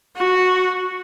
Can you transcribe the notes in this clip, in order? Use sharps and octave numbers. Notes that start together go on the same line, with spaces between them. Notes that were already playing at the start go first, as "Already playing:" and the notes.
F#4